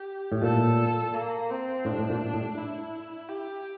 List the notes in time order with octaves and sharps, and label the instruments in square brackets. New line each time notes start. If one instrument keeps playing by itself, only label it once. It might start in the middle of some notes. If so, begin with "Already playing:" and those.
Already playing: [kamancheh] G4
[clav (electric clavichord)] A2
[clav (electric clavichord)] A#2 [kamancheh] A4
[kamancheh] A#3
C4
[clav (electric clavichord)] A2 [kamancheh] D4
[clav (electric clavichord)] A2
A#2
A2
[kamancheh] E4
G4